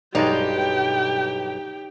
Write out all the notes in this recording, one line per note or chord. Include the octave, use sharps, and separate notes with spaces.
B1 G2 G#3 D#4 G4 D5 F5 G5